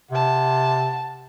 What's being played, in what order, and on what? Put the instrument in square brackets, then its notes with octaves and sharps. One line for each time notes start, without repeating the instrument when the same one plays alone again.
[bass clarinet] C3 [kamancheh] F#5 A5